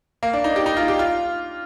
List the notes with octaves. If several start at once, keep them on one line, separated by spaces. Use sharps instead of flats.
A#3
D4
D#4
G4
D#4
F4
G4
F4